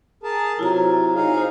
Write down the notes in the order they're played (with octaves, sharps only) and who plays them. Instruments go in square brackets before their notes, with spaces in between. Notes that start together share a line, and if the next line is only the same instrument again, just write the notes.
[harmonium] G#4 A#4 A5
[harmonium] C3 F#3 [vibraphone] E4 F4 A#5
[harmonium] D#4 G#4 F5
[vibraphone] F4 C5